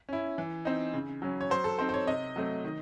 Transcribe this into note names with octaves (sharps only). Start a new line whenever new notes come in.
C#4 E4
E3
C4 D#4
C#3
F#3 C#4
C#5
F#3 C5
A4
C4 D#4 C5
C5
C#5
C3 D#5
F#3 A3 C4
D#3